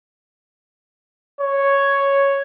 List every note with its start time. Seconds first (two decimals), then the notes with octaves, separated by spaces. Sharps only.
1.41 C#5